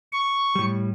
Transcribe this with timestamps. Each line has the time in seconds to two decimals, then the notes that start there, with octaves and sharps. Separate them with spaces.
0.13 C#6
0.55 A2 G3